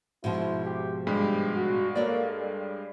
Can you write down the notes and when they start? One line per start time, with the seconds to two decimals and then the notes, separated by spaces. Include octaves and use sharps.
0.24 G#2 B2 F3 E4
0.65 G4
1.07 G2 G#3 G4 B5
1.55 F#4
1.96 A#3 A4 C#5 D5
2.39 G3